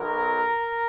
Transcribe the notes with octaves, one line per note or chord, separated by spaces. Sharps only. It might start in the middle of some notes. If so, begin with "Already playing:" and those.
Already playing: B1 B2 F#3 A#4